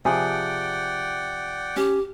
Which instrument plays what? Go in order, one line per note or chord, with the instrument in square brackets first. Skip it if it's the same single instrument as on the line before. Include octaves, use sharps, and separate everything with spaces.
[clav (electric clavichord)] C3 F3 [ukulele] G#4 [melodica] D5 F#5 G5
[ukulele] C#4 [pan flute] G4